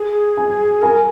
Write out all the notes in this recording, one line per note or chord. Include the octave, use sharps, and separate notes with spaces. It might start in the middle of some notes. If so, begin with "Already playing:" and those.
Already playing: G#4
G#5
A#4 G#5